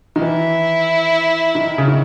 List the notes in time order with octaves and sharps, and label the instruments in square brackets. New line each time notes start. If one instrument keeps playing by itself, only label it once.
[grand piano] D#3
[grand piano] E3 [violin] E4
[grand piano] D#3
C#3
D#3